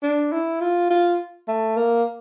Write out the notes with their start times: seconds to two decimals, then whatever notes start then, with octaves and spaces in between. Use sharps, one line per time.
0.03 D4
0.32 E4
0.61 F4
0.90 F4
1.48 A3
1.77 A#3